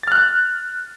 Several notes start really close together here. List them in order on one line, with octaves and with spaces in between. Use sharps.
A6 F6 F#6